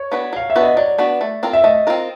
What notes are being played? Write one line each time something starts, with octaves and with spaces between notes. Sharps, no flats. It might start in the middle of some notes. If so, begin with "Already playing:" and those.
Already playing: C#5
B3 D4 F#4 B4
F#3 F5
E5
B3 D4 F#4 B4
D#5
F#3 D5
B3 D4 F#4 B4
A3
C4 F4 A#4
E5
A3 D#5
C4 F4 A#4